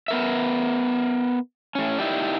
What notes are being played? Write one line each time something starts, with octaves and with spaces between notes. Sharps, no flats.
B3 A#4 E5
A2 C#4
D#4 E4 G4 D5